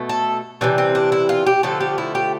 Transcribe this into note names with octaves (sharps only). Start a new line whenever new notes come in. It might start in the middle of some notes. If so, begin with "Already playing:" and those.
Already playing: B2 A3
A4
C3 E3 G3 D4
C4
D4
E4
F4
G4
D3 F3 A3 A4
G4
E4
G4